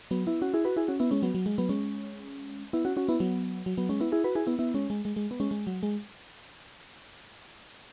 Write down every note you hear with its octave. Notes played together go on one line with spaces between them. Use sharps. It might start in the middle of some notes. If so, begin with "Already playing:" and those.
F#3 B3
B3 E4
C#4 F#4
E4 G#4
F#4 B4
E4 G#4
C#4 F#4
B3 E4
G#3 C#4
F#3 B3
F#3
G#3
F#3 B3
G#3 C#4
B3 E4
C#4 F#4
C#4 F#4
B3 E4
F#3 B3
F#3
F#3 B3
G#3 C#4
B3 E4
E4 G#4
F#4 B4
E4 G#4
B3 E4
B3 E4
G#3 C#4
G#3
G#3
G#3
B3
G#3 C#4
G#3
F#3
G#3